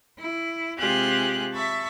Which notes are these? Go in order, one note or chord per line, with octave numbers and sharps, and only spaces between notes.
E4
C3 G#3 F4 G4 G#4 F#6
E5 A5 B5 C#6